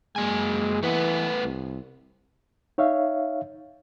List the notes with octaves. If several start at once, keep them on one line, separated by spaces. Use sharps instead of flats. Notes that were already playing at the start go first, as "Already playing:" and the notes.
F#2 G#3 A#3 G#5
E3 A3 B4 F#5
C2
D#4 C#5 E5 F5